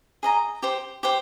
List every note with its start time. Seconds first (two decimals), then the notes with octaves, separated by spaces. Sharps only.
0.23 G#4 D#5 A#5
0.63 G4 C5 G5
1.03 G4 C5 G5